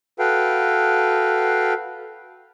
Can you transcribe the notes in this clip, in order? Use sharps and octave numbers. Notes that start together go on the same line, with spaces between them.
F#4 A4 B4 F5 G5